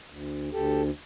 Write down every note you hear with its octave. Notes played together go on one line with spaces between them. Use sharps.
D2
D2 G4 A4